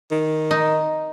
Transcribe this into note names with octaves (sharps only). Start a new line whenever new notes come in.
D#3
D#4